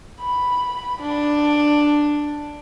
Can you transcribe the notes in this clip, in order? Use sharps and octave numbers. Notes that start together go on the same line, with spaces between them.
B5
D4